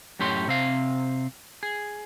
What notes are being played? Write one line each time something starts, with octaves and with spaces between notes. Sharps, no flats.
F#2 A2 G4 C#5 C6
C3 C4 F5
G#4